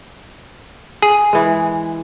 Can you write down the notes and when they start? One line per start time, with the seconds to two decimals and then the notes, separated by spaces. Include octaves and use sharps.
1.02 G#4
1.33 E3 G#3